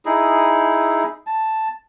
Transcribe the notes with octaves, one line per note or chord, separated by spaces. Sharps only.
D#4 E4 G#4
A5